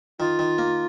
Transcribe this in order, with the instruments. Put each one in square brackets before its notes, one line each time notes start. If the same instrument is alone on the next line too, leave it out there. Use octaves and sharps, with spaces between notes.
[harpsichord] D#3 [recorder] F4
[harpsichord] D#3
A#3